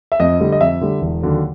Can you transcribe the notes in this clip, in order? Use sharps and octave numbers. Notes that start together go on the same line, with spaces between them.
E5
F2 D#5
D3 G3
D#5
F2 E5
D3 G3
E1
D#2 D3 F#3